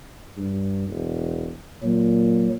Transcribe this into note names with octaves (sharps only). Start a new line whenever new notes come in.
G2
E1
A#2 F#3